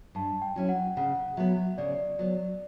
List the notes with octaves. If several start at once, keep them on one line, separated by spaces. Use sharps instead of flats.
G2 A5
G5
F#3 C#4 E4
F#5
C#3 F#5
F#3 B3 E5
C#3 D5
F#3 B3